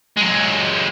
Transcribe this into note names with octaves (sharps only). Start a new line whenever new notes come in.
F#3 G#3